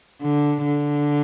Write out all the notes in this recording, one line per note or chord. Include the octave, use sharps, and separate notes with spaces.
D3
D3